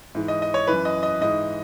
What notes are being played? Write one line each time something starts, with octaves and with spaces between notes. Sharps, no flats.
G#2 E3
D#5
D#5
C#5
F#2 E3 B4
D#5
D#5
G#2 E3 D#5